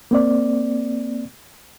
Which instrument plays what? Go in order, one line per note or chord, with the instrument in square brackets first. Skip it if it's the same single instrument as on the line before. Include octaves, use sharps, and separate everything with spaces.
[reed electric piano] A#3 C4 D5